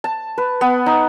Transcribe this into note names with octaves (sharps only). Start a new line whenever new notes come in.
A5
B4
B3
D#4